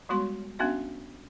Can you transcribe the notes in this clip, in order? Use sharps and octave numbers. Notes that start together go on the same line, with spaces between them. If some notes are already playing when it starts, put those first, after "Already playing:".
G3 G#3 B3 F#4 C6
B3 C#4 D4 F#4 E5